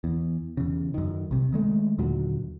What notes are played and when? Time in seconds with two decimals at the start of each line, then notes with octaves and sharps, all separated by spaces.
0.04 E2
0.57 E2 C#3
0.94 F#2 D#3
1.31 C2 C3
1.52 D#3 G#3 A3
1.98 D#2 A#2 D3 F#3